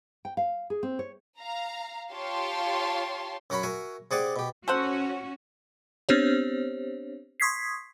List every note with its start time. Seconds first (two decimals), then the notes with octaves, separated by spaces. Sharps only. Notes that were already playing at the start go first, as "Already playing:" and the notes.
0.25 G5
0.37 F5
0.70 G#4
0.83 C4
0.99 C#5
1.39 F5 A#5
2.11 F4 G4 C#5 F5 A5 C6
3.50 F#2 C#4 F#4 A#4 C#5 B5
3.63 F#4 A#4 E5 G#5
4.11 C3 G#4 D5 F#5 G#5 D6
4.36 B2 G4
4.68 C#4 F#4 A4 C5 F#5
6.09 B3 C4 D4 G4 C5 C#5
7.40 C6 C#6 D#6 G#6 B6 C7